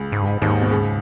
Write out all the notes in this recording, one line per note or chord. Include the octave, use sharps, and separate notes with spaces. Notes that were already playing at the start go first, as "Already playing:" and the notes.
Already playing: C#2 C#3
G#2
G2
G#2
D#2 G#2 D#3
B2
C#2 C#3